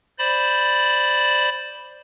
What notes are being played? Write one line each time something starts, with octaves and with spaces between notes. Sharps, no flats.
C5 D5 B5